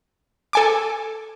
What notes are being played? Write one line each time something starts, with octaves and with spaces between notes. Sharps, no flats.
A4 G#5 D6